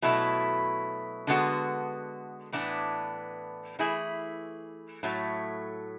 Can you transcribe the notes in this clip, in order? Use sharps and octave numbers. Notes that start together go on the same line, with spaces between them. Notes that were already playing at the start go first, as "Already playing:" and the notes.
B2 F#3 A3 E4
D3 G#3 B3 F#4 A4
A2 E3 B3 D4
E3 A3 E4 G#4
A2 F#3 A3